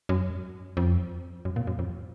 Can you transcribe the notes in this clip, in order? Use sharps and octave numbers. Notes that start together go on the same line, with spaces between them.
F#2
F2
F#2
A#2
F#2
F2